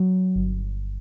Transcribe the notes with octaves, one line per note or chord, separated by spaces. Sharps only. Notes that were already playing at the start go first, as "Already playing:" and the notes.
Already playing: F#3
G1